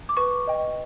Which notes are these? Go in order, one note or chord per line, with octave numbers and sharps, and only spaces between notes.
D6
B4 C#6
D#5 G5